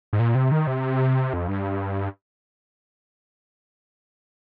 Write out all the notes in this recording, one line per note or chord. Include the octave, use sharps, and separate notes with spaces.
G#2
A#2
C3
D#3
C3
F2
G2